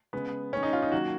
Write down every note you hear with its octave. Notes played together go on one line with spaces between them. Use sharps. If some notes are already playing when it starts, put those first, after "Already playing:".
C#3 G#3 B3
D#3 G#3 C#4
D#4
F4
D#4
D#3 F#3 A#3 F#4